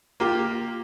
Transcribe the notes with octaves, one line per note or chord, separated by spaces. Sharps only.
A#3 F4 G4